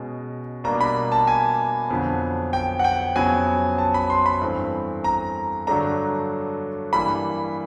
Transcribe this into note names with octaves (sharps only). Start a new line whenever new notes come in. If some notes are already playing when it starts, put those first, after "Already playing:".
Already playing: B2 G#3 C#4
B2 G3 A#3 D4 A#5
B5
A5
G#5
F2 D3 F#3 B3
G5
F#5
G5
F2 C#3 F#3 B3 G#5
A5
B5
C6
B5
G2 E3 A3 C4
A#5
G2 D3 F#3 A3 D4 A#5
G2 E3 G3 A#3 B5